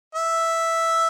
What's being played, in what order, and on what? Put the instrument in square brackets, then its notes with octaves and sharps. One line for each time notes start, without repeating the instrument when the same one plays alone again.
[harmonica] E5